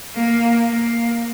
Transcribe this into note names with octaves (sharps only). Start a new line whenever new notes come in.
A#3
A#3